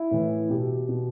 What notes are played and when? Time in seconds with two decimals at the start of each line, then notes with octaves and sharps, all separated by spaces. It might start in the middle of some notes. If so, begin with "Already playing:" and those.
Already playing: E4
0.11 A2 E3
0.49 B2 G4
0.89 B2